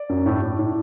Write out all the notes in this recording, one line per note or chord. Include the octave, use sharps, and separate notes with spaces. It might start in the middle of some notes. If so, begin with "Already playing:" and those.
Already playing: D5
F#2
A2
A2
A2